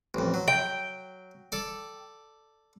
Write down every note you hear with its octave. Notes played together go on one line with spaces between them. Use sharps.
A1 F2
F#3
G5
A4 D5